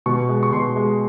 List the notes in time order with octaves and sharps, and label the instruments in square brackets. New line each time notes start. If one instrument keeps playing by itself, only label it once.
[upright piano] B2 C#6
G#3
C#6
B2 C6
G#3